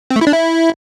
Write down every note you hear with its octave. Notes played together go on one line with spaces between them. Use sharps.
C4
A3
E4
D4
E4